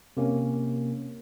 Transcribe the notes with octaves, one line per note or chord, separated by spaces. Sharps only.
C3 A#3 C#4